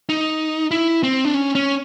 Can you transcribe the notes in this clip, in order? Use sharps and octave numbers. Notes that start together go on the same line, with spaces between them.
D#4
E4
C4
D4
C#4
C#4